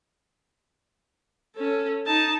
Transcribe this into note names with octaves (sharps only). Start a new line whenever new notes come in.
C#4 A4
D#4 A5